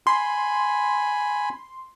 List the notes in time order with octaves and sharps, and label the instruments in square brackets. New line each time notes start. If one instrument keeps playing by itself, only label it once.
[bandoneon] G#5 B5 [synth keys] C6